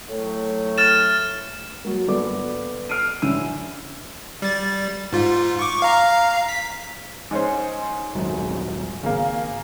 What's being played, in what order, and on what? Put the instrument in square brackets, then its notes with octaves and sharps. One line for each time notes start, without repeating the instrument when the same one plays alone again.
[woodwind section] A2 F#3 A3
[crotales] F6 A6 E7
[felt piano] F#3 A#3
G1 B3 A4 D5 D6
F6 C7 D7 D#7
A1 D3 C#4 E4 E6 D#7
[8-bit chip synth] G3 A6
G#2 F4
C#6 D6
F5 A#5
B6
[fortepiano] G#2 C#4 C5
[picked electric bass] D#1 G#1 F#2
[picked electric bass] G#1 [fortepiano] C#3 A#3